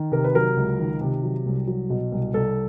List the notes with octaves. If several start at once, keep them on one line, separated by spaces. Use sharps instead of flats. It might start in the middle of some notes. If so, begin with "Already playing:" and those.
Already playing: D#3
C3 A#4
B4
F#3 A#4
C#2
D#3
C3
F#3
C2
F#3
B2
C2
C2 A4